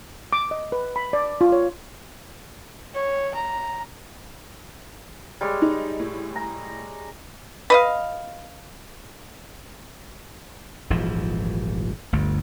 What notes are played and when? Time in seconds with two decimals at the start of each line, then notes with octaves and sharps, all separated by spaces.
0.33 D6
0.51 D#5
0.72 B4
0.96 B5
1.13 D5
1.41 F4
1.52 C#5
2.94 C#5
3.35 A#5
5.41 G3 G#3 C#5
5.62 D#4
5.99 A2
6.36 A#5
7.70 B4 D#5 F5
10.90 D#1 G#1 E3 F3
12.12 G1 D2